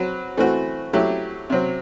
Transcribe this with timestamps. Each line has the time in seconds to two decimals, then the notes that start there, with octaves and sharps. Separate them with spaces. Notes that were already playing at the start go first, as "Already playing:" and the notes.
Already playing: F#3 C4 F#4 B4
0.37 E3 A3 C4 F#4
0.93 F#3 A3 E4 G4
1.50 C3 F#3 C4